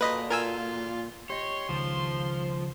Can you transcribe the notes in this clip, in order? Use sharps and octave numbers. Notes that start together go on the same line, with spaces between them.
A#2 F#4 A4 B4 D#5 B5
F4 A#4 G#5 E6
G4 C#5 D#5 C6
C#2 D#3 F3